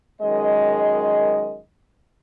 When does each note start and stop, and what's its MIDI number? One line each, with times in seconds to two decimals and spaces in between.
0.22 1.60 42
0.22 1.60 51
0.22 1.60 56
0.22 1.60 75